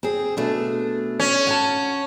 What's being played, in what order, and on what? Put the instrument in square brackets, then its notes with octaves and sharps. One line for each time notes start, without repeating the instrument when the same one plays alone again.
[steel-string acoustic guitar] C4 G#4
B2 A3 D4
[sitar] C#4
[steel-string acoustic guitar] F#5 G5 A5